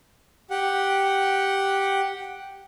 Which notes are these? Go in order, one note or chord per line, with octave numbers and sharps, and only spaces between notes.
G4 F#5